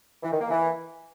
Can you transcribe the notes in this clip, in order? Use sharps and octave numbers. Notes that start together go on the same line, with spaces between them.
E3
D#3
A#3
E3